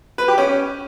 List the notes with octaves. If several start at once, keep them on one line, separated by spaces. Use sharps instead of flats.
B4
G4
C#4